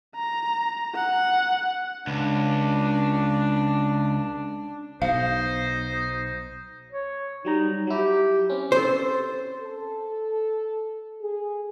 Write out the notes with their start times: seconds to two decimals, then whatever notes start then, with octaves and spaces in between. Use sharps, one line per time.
0.15 A#5
0.95 F#5
2.07 C#2 D4
5.02 B1 D#4 C5 F5
6.91 C#5
7.45 F#3 G3 D#4 A#5
7.87 F#3 E4 G4
8.50 C4 C#4
8.72 A4 C5
9.62 A4
11.21 G#4